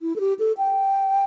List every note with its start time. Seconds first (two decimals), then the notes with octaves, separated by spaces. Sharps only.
0.02 E4
0.16 A4
0.20 G4
0.39 A4
0.58 G5